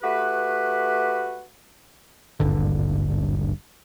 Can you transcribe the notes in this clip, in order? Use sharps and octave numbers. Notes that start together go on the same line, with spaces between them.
A3 F#4 G4 B4
D#1 G#1 G2 D3